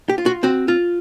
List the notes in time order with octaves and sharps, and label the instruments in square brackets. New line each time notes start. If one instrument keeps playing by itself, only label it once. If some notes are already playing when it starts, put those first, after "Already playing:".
[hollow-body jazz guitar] G4
F4
F#4
C4 F#4
F4